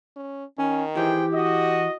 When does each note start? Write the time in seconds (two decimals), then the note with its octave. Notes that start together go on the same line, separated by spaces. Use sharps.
0.16 C#4
0.59 D#3 C#4
0.95 E3 E4 G4 G#4 C5 G5
1.33 F#4 D#5